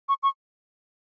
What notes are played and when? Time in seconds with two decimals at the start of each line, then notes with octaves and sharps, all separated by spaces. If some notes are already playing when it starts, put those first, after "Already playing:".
0.09 C#6
0.23 C#6